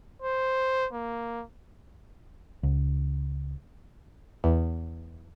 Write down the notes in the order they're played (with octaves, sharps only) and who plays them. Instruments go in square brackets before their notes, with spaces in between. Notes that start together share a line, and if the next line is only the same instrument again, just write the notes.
[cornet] C5
A#3
[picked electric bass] C#2
[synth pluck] E2